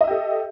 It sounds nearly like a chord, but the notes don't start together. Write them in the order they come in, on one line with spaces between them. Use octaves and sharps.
D#5 E5 G4 A4